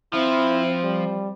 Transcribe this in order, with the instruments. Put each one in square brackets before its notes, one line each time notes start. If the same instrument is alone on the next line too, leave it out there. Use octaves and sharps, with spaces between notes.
[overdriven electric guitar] F3 [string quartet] C4 [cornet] E4
[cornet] G3